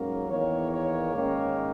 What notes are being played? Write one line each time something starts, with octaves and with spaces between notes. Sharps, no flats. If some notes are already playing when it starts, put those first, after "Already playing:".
Already playing: G#2 F#3 A#3 C#4 A#4
E2 D#3 A#3 C#5
C#5
G#2 D#3 A#3 C#4